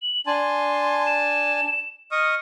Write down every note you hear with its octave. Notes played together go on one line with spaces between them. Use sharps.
F#7
D4 G#5 A5 C6
E7
D#5 C#6 D#6 F6